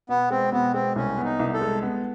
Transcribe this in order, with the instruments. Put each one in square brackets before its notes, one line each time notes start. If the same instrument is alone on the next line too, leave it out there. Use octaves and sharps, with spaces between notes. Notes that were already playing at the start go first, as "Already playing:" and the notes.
[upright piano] B2 [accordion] B3
[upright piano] G#3 [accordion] C4
[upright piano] B2 [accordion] B3
[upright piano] G#3 [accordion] C4
[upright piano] C2 [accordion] C#4
[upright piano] B3
[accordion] D#4
[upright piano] C2
[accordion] A4
[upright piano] G#3
B3